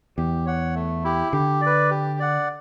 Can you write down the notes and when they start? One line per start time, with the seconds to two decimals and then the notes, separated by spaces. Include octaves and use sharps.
0.17 E2 G4
0.46 C#5 F#5
0.75 A3
1.04 E4 G4
1.33 D3 G4
1.61 B4 D5
1.91 G4
2.20 D5 F#5